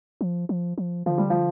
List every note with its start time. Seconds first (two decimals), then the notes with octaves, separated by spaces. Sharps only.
0.21 F3
0.49 F3
0.78 F3
1.06 D3 F3
1.18 G3
1.30 F3